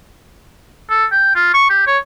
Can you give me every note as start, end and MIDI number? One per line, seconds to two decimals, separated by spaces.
0.90 1.05 69
1.12 1.35 79
1.36 1.51 65
1.54 1.69 85
1.70 1.87 67
1.87 1.98 73